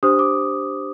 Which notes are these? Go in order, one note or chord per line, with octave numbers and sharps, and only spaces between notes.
D4 G4 C5 D#6
D6